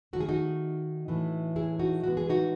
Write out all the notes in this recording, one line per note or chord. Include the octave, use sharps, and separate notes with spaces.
D#3 A3 F#4
G#4
D#4 F#4
A2 E3 A3
E4 G#4
D#4 F#4
A2 E3 G#3 B3 F#4
G#4
D#4 F#4